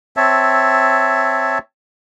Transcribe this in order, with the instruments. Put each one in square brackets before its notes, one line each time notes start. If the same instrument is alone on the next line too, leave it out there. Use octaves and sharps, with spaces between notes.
[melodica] C4 C#5 E5 A5